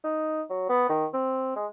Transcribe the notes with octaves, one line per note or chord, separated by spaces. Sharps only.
D#4
F#3
B3
D#3
C4
G#3